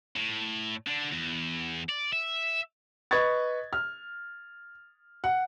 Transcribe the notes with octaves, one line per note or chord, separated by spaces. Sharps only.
A2
D3 D4
E2
D5
E5
B4 D#5 C#6 G#6 A6
F6
F#5